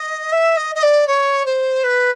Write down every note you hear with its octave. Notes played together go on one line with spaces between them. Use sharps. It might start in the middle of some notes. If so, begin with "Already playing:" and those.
Already playing: D#5
E5
D#5
D#5
D5
C#5
C5
B4